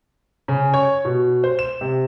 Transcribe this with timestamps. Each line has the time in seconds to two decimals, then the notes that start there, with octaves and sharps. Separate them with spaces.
0.48 C#3
0.74 C#5
1.05 B2
1.44 C5
1.59 E7
1.81 C3